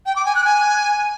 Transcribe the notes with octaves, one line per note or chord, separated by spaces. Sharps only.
G5
D6
G#5
F#6
G#5